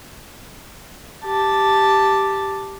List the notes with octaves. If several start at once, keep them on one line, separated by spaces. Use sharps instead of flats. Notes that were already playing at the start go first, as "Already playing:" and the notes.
G4 A5